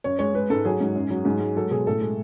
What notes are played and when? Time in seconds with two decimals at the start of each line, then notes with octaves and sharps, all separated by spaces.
0.04 F#2 C#5
0.19 G#3 C#5
0.34 G#3 B4
0.50 G#2 A4
0.65 F#3 G#4
0.80 G#2
0.95 F#2
1.10 F#3
1.25 G#2
1.40 G#3
1.56 F#3 A4
1.71 B2 G#4
1.87 A2 A4
2.01 G#3